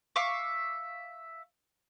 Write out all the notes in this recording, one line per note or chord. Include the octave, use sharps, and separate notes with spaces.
E5 F5 C#6 D6